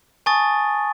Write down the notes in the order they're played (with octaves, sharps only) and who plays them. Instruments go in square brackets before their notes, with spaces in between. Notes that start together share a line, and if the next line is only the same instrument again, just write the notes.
[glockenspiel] G#5 A5 C#6 D#6 A6